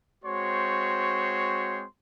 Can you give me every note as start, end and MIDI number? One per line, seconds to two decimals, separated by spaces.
0.25 1.84 56
0.25 1.84 60
0.25 1.84 66
0.25 1.84 72
0.25 1.84 73
0.25 1.84 84